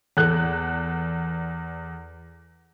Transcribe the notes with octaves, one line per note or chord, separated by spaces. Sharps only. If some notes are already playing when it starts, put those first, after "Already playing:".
E2 A4 F#6